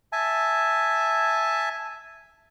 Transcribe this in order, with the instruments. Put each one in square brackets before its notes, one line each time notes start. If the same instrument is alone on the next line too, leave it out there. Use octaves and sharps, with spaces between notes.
[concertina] E5 G#5 A5